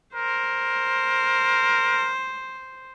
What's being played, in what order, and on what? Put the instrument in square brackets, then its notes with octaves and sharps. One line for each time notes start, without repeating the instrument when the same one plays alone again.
[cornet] A#4 [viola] C5